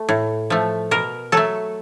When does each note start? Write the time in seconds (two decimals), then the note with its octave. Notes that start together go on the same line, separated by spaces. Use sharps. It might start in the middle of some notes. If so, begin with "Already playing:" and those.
Already playing: A3
0.09 A2
0.50 F3 A3
0.91 B2 A#4
1.32 F#3 A3 A4